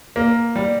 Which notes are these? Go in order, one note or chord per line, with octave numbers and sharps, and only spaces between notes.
A#3
G3